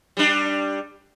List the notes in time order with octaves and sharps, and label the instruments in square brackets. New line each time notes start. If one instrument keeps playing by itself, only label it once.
[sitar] G3 D4